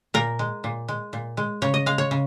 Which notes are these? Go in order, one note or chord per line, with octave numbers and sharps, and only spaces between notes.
A#2 A#4
G#3
A#2
G#3
A#2
G#3
C#3 C#5
D#5
G#3 F5
C#5
C#3